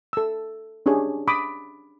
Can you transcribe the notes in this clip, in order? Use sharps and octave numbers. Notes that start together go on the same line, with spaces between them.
A4 E6
C#4 D4 G4 G#4 C#5
B5 D6 D#6